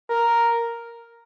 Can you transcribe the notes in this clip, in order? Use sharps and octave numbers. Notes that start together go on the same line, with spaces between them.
A#4